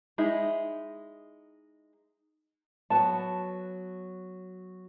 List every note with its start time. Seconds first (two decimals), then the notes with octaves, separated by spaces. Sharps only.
0.18 G#3 D#4 E4
2.90 F#3 B3 A5